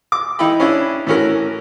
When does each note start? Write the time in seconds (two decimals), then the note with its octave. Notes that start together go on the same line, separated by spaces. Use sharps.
0.12 D6
0.39 E3 D#4 E4 G5 B5
0.60 C#4 D4 E4
1.07 A2 E3 C#4 F#4 A#4